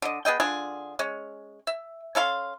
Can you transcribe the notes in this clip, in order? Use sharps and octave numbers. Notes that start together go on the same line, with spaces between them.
D3 D#5
B3 G#4 D#5 G5
D3 D4 F4 G#4
G#3 C#4
E5
C#4 A4 F5 C6